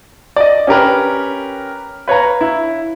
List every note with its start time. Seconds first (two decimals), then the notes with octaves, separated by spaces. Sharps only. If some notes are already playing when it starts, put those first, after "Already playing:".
0.36 D5 D#5
0.67 C#4 G4 A#4 B4
2.08 B4 C#5 F5 A#5
2.41 E4